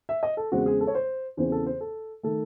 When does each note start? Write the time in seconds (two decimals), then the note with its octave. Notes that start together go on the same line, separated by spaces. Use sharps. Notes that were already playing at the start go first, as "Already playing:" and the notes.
0.09 E5
0.23 D#5
0.37 A4
0.52 E2 C#3 G#3 C4 F#4
0.66 G#4
0.81 A4
0.87 C#5
0.95 C5
1.37 E2 C#3 E3 C4 C5
1.52 A4
1.66 C5
1.81 A4
2.23 D#3 A3 A4